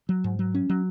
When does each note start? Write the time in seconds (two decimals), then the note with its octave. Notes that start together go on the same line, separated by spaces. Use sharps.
0.09 F#3
0.24 G#2
0.39 F#3
0.54 C#4
0.69 F#3